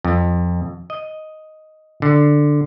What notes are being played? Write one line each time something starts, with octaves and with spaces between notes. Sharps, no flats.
F2
D#5
D3